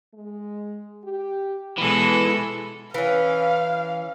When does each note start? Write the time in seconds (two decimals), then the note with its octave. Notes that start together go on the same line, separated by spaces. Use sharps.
0.14 G#3
1.04 G4
1.78 B2 E3 G#3 B3 A4
2.94 E3 C#4 F5